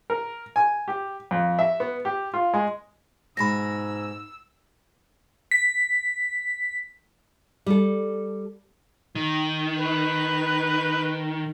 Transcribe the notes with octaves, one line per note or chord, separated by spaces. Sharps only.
A#4
G#5
G4
F2
E5
B3
G4
F4
G#3
G#2 B2 G#3 B5 E6 A#6
B6
G3 A4
D#3
B4